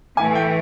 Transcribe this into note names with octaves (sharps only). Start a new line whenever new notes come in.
A2 E3 A3 G#5
G5